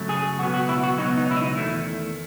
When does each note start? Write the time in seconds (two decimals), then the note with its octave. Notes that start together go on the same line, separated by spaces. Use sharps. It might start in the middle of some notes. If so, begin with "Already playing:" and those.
Already playing: F#2 C#3 F#3 A3
0.09 G#4
0.38 C#2 B2 F#3 B3 F#4
0.54 F#4
0.69 E4
0.83 F#4
0.97 C#2 B2 F#3 B3 D#4
1.17 D#4
1.31 E4
1.37 D#4
1.56 E2 D#3 A3 E4